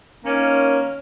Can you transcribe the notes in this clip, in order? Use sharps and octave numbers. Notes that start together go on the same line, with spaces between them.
D#3 A#3 C#4